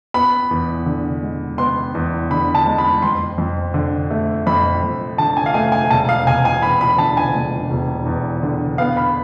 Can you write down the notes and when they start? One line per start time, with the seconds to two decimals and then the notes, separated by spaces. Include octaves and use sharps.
0.14 B3 B5
0.51 E2
0.86 D3
1.22 G#3
1.58 B3 C6
1.95 E2
2.30 D3 B5
2.55 A5
2.66 G#3
2.78 B5
3.02 F2 C6
3.38 F2
3.74 D3
4.10 A3
4.47 F2 B5
4.83 F2
5.18 D3 A5
5.37 G#5
5.46 F5
5.54 A3 G#5
5.72 G#5
5.90 E1 A5
6.09 F5
6.26 E1 G#5
6.45 G#5
6.62 E2 B5
6.81 B5
6.98 D3 A5
7.17 G#5
7.35 E1
7.71 E1
8.06 E2
8.43 D3
8.78 B3 F5
8.97 B5